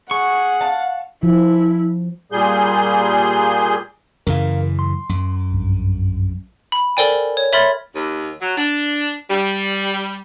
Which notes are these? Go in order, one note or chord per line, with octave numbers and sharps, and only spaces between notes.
G#4 F#5 C#6
F5 A5
F3 E4
A#2 G3 G#4 G6
F#2 C#3 E3 A#4 F5
C6
F#2
A#1 G2
B5
A4 A#4 C5 D5 G5 G#5
C#5
C#5 E5 B5 C6 F6 A6
D#2
F#3
D4
G3